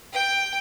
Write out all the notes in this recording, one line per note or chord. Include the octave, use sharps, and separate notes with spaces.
G5